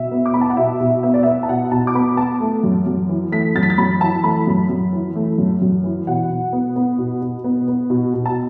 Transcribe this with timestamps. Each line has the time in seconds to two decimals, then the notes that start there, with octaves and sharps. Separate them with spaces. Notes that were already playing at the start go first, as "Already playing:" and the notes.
Already playing: B2 E5
0.11 B3
0.26 D6
0.34 B3 B5
0.41 A5
0.50 F#5
0.57 B2 E5
0.80 B2
1.03 B3 E5
1.14 D5
1.23 B3 E5
1.43 A5
1.49 B2 F#5
1.71 B2 A5
1.87 D6
1.95 B3 B5
2.17 B3 A5
2.40 A3
2.64 F#2
2.86 F#2
3.09 E3
3.32 A3 B6
3.55 F#2 A6
3.63 B6
3.70 A6
3.78 F#2 B5
4.01 E3 A5
4.24 A3 B5
4.47 F#2
4.70 F#2
4.93 E3
5.15 A3
5.38 F#2
5.62 F#2
5.84 E3
6.07 B2 F#5
6.30 B2
6.53 B3
6.76 B3
6.98 B2
7.22 B2
7.44 B3
7.68 B3
7.90 B2
8.14 B2
8.26 A5